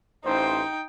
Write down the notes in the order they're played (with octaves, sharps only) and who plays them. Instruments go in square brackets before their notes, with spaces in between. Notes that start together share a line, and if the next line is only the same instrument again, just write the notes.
[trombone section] A1 C5 [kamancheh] D#4 G5